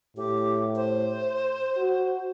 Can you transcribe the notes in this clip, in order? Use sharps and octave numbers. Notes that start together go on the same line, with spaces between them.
A2 G4
C5
F#4